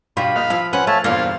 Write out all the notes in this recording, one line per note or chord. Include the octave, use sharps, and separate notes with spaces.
G2 B2 F4 G4 B5
A#1 D#5 F5
F3 E4 F4 F6
C4 C#4 B4 F#5
A3 C#5 E5 F5 A5
E2 G2 A#2 A#3 C4 F4 F5